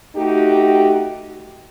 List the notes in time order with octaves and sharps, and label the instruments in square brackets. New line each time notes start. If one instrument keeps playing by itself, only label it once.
[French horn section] A3 D#4 F#4 G4